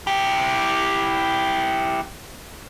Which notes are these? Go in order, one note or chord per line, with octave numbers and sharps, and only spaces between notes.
E4 G4